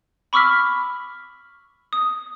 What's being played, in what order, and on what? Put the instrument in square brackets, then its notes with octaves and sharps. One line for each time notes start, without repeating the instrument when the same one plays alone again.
[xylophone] B5 C#6 D6 E6 F6 B6
D#6